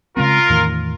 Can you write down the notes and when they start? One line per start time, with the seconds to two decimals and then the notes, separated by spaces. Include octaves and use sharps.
0.17 C#3 G#3 C4 F4 A#4
0.50 E2 A2 D#3